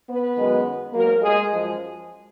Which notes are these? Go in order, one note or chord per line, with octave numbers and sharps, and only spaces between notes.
B3 B4
F#2 D#3 G#3
G#2 F#3 A#3 A#4
G#3 G#4
F#2 F3 G#3